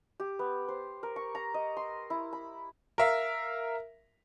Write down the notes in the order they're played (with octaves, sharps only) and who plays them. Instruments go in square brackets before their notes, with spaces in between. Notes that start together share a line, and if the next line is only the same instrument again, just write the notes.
[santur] G4
B3
C5
A#4
C#6
A#5
D#5
C6
E4
B5
[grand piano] A#4 E5 F5